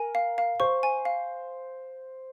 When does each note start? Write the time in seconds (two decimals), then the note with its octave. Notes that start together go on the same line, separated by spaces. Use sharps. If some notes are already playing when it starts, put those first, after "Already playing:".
Already playing: A#4 G#5
0.15 F5
0.38 F5
0.60 C5 C#6
0.83 G#5
1.05 F5